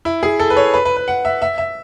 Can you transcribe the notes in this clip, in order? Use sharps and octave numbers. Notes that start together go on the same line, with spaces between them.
E4
G#4
A4
B4
C#5
B4
B4
B4
F#5
E5
E5
E5